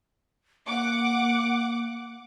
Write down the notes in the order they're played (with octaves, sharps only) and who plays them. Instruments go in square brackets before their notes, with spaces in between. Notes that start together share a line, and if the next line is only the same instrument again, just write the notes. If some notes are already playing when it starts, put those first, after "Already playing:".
[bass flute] A#3 [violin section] F#5 D6